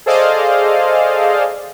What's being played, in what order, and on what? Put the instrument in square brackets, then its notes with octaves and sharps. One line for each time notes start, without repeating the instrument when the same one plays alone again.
[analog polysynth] G#4 A4 C5 D5 D#5 F5